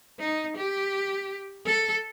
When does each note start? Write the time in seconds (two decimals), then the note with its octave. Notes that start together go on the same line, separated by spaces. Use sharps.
0.19 D#4
0.57 G4
1.66 A4